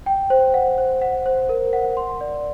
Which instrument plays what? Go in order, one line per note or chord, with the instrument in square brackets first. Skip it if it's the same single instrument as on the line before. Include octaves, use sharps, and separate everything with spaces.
[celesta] G5
C5
F#5
C5
F#5
C5
A#4
F#5
C6
D5